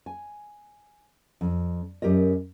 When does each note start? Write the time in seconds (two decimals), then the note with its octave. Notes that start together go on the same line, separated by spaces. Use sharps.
0.06 G#5
1.41 F2
2.02 F#2 G4 A#4 D#5